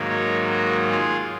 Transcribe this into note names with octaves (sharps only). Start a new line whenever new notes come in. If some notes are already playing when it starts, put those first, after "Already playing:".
Already playing: G#2 D#3 F#3 A#3
A#4 C#5
F#4 A#4
F4 G#4